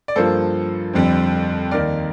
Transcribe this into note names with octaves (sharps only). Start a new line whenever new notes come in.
D5
G2 F3 A#3 A4 C5
F2 D3 G3 C4
D#2 D#3 A#3 A#4 D5